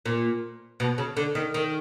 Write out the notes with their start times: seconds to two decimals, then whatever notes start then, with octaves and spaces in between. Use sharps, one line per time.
0.06 A#2
0.80 B2
0.98 C#3
1.17 D3
1.35 D#3
1.54 D#3